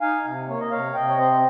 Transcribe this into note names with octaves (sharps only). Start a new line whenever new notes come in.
D#4 F5 G#5
C3
A#3 C#5
D#5
C3 C#5 F5
C3 D#5 G5
C#5
C4 C5 D#5